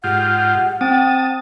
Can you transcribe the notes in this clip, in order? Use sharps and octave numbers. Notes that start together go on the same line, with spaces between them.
G#2 F4 G4 F#5
C4 A5 D#6